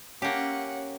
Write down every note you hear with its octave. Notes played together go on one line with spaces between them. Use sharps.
A#3 C#4 G4 F#5